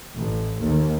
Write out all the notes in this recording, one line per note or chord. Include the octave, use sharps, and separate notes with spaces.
A1
D#2